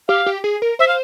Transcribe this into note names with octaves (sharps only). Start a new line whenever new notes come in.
G4 F5
G4
G#4
A#4
C5 E5
F5